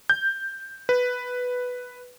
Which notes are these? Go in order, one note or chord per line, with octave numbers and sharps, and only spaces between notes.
G6
B4